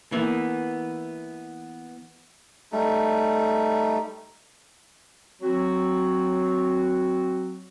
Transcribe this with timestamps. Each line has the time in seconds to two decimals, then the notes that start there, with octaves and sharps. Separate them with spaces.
0.12 E3 A#3 B3
2.72 G3 A3 D#4
5.41 F#3 C4 F#4